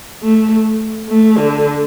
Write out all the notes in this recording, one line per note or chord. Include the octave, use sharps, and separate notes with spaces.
A3
A3
D3